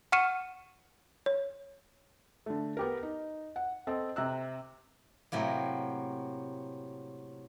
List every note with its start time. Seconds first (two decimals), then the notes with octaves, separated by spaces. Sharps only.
0.12 F#5 C#6 F6 C#7 D#7 E7
1.26 C#5
2.46 D3 A3
2.77 B3 G4 A#4
3.03 D#4
3.56 F#5
3.87 C4 A4 D#5
4.16 C3 A#5 E6 F#6
5.32 A2 C3 F#3 A#3